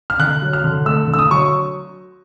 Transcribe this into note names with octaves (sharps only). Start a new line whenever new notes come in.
F6
D3 F#6
F#3
F6
D3
A3 E6
D3
E6
D#6
F#3 C#6